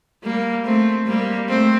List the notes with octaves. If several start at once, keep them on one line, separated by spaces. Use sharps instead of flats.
G3 A#3
A3 C4
G3 A#3
A3 C4